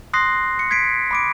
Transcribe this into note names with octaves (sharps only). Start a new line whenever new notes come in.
C6 D#6 F#6 A#6 C7
C#7
G#6 B6 C7 D7
B5 D6 D7